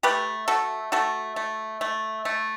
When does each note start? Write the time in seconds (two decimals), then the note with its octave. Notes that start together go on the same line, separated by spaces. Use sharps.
0.03 A3 G4 B4
0.48 A3 F#4 A4
0.92 A3 F#4 A4
1.36 A3
1.81 A3
2.25 A3